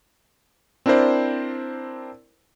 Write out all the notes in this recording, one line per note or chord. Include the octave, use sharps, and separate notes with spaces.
C4 D4 E4 A#4 C5 D5